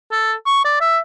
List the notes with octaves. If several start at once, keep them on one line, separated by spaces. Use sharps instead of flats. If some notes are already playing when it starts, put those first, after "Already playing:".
A4
C#6
D5
E5